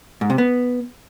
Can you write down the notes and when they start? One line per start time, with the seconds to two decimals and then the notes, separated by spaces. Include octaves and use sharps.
0.21 G#2
0.30 C3
0.38 B3